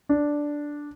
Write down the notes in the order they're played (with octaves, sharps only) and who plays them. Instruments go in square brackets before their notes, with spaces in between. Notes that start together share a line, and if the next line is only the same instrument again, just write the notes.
[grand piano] D4